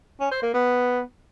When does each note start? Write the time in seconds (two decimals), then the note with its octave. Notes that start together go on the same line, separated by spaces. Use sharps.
0.20 C#4
0.31 C5
0.42 A#3
0.54 B3